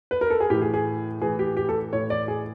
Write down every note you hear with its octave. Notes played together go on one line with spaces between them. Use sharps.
B4
A#4
A4
G#4
A2 E3 G4
G#4
G#4
A2 E3 G#4
G4
G4
A4
A2 E3 C#5
D5
G#4